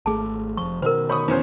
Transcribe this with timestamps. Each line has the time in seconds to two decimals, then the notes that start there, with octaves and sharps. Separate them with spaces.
0.06 G#1 A3 G#4 A5
0.57 F1 F3 C#6
0.82 B2 D#3 A#4 C5
1.10 C#5 B5 C#6 D#6
1.28 E2 C#4 C5